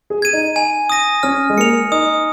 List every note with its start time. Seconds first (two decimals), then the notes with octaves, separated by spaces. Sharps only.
0.10 G#4
0.22 G#6 D#7
0.33 D#4
0.56 G#5
0.90 D#6 A#6 D#7
1.23 C#4 F6
1.50 G#3
1.58 A#3 C#7 F7
1.91 D#4 D#6